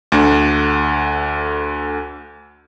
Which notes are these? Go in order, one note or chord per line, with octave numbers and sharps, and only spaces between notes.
D2 D3